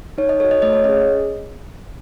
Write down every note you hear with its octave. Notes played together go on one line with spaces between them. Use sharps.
D#4 C#5
D#5
F#4 A4 C#5
D#5
A3 D#5
C#5
C#4 G#4 D#5